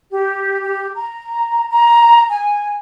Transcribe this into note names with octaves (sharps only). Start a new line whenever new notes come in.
G4
G4
A#5
A#5
G#5